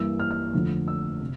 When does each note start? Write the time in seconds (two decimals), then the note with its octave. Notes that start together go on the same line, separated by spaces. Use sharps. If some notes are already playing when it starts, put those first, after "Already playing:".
Already playing: G2 E3 G3 A#3 E6
0.20 F6
0.31 F6
0.53 F2 D3 F3 A3
0.88 E6
1.21 C3